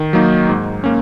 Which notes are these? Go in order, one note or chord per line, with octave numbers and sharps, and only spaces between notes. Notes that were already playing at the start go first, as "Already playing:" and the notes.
Already playing: D#3
F#3 A#3 D#4
G#2
A#3 C#4